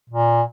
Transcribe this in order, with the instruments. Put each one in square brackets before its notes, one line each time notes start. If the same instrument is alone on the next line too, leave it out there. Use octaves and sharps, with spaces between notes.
[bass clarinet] A#2